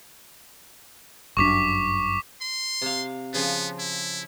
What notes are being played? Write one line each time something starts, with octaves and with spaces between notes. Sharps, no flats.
G1 F#2 D4 C#6 D6 B6
C6
C3 F5
C#3 F3 B3
E4